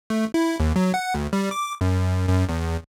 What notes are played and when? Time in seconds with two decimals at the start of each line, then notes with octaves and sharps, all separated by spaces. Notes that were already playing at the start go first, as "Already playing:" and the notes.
0.10 A3
0.34 E4
0.60 D#2
0.76 F#3
0.94 F#5
1.15 D2
1.33 G3
1.51 D6
1.81 F#2
2.28 F#2
2.49 E2